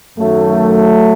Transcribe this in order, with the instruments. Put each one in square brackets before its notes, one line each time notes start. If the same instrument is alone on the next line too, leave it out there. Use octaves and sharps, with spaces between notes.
[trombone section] F#2 D#3 F#3 A3